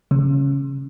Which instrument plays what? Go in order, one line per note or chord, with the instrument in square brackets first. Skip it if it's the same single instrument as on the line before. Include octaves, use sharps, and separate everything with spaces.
[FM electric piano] C#3